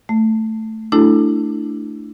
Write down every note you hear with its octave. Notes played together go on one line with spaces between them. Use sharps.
A3
A3 D4 E4 F#4 A4